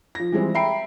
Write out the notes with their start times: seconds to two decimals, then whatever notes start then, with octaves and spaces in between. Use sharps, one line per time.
0.15 F3 A#6
0.32 E3 G3 G#3 C4
0.54 E5 G5 A#5 B5 C7 D7